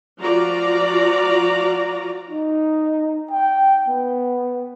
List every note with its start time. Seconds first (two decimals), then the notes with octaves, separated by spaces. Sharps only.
0.21 F3 F4 F#4 D5 A#5
2.30 D#4
3.31 G5
3.88 B3